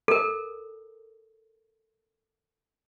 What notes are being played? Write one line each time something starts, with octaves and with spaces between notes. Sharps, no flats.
A4 A#4